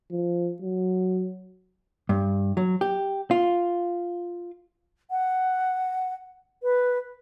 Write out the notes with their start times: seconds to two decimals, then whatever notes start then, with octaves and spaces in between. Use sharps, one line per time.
0.11 F3
0.62 F#3
2.09 G2
2.57 F#3
2.81 G4
3.31 F4
5.11 F#5
6.63 B4